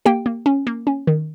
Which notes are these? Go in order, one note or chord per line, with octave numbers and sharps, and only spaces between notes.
A#3 G4 G5
A#3
C#4
A#3
C#4
D#3